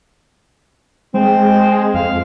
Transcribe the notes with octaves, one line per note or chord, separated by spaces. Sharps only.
G#3 C4
F2 F5